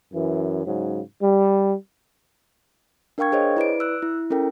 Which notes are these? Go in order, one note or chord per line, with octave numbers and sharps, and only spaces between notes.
F#2 E3
G#2 C#3 F#3
G3
D4 A#4 F5 G5 C#6 G#6
G#4 C5 C#5 D#5
E4 B4 D5 D7
E6 F#6
E4
C#4 E4 A4 A#4 G5